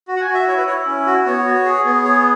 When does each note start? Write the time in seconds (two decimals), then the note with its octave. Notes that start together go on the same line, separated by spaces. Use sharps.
0.08 F#4
0.16 F#5
0.21 G#5
0.27 F#4
0.34 E5
0.47 E4 C#5
0.57 B4
0.67 E4 C#5
0.86 C#4
1.06 F#4
1.26 B3 C#5
1.46 F#4
1.65 G#4
1.85 B3
2.04 G#4 C#5